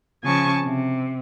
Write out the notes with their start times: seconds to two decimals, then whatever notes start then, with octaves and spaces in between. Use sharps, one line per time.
0.22 C#3 F3 G#5 A5 C#6
0.62 C3